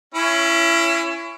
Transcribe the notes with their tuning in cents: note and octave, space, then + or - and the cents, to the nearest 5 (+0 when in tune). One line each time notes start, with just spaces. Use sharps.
C#4 +0 E4 +30 C#5 +10